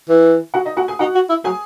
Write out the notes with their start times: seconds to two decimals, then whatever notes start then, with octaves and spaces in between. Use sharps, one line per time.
0.09 E3
0.54 F#4 F#5
0.65 D#4 D#5
0.77 F#4 F#5
0.88 G#4 G#5
0.99 D#4 F#4 F#5
1.15 F#4
1.29 E4
1.44 F#3 G#4 G#5